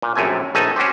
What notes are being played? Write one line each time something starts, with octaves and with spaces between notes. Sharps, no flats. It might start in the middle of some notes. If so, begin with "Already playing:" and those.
A#2
A#1 F#2 C3 A3 G#5
A#1 A3 D#4 A4 G#5
C#4 F#4 G4 C5